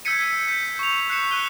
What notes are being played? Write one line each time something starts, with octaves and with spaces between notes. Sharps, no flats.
E6 G6 G#6 B6 C#7 D#7
B6
G6 B6
C#6 F7
F#6 C7 C#7 E7
F#6 D#7 G7